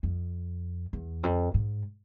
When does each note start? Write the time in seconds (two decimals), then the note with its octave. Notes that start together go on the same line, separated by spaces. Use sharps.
0.03 F2
0.93 E2
1.23 F2
1.54 G#2